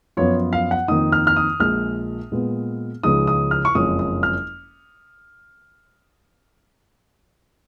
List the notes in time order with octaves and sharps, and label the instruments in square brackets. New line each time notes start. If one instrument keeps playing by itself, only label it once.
[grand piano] F#2 F3 B3 F4 C#5
F5
F#5
F2 D#3 A#3 D#4 D#6
F6
F6
D#6
A#1 A#2 G#3 F6
A#2 G#3 B3
C#2 C#3 F3 G#3 D#4 D#6
D#6
F6
C#6
F#1 F2 F3 G#3 C#4 D#6
D#6
F6